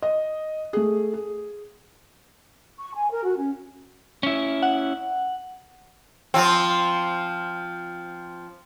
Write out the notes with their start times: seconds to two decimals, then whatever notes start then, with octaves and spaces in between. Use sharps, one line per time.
0.02 D#5
0.73 A3 G#4
1.14 G#4
2.78 C#6
2.94 G#5
3.11 A#4
3.24 F#4
3.38 C#4
4.23 C#4 E4
4.63 F#5
6.34 F3 C4